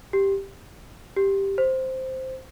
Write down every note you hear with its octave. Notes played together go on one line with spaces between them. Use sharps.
G4
G4
C5